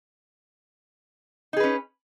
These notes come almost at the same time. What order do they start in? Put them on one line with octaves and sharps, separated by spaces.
D#4 G#4 B4 C#4